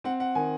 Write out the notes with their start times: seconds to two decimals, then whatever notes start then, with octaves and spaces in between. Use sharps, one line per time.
0.04 C4 F#5
0.20 F#5
0.35 D#3 G#5